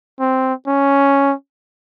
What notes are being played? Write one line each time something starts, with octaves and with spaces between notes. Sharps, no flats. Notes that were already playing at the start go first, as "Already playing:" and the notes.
C4
C#4